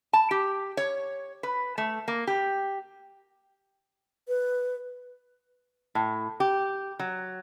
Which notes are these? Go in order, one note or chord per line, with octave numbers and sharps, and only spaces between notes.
A5
G4
C#5
B4
A3
A#3
G4
B4
A2
G4
F#3